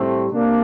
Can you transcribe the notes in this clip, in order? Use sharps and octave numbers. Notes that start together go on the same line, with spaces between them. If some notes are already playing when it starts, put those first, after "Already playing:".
Already playing: A2 G3 A3 C4
C3 A#3 D4